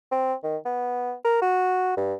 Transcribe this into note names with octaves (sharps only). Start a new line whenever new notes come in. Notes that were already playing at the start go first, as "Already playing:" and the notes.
C4
D#3
B3
A#4
F#4
G2